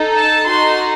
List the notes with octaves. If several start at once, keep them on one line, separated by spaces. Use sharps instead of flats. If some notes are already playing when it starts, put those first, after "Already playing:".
Already playing: D#4 A4
A5
D#4 F#4 A4 C6